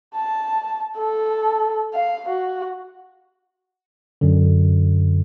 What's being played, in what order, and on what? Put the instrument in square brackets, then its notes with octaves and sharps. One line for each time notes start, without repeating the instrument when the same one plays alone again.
[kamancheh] A5
A4
F5
F#4
[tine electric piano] F#2 D3